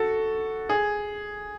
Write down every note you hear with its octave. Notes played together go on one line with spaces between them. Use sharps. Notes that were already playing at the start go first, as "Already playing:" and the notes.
Already playing: F#4 A4
G#4